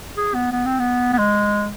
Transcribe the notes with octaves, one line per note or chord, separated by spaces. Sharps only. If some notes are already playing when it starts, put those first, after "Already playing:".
G#4
B3
B3
C4
B3
B3
G#3